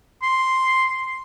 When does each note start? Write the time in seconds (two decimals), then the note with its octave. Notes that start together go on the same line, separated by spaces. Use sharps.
0.22 C6